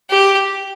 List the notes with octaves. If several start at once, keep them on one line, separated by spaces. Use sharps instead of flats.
G4